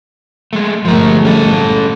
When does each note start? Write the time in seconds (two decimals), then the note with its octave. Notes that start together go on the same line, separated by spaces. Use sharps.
0.53 G#3 A3
0.85 G1 F3 G#3 A3 A#4
1.25 C#4 A4